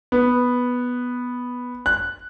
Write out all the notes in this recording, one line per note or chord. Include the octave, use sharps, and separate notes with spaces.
B3
F#6